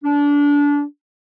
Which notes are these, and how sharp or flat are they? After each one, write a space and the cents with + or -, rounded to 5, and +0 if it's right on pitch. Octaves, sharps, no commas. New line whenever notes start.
D4 -25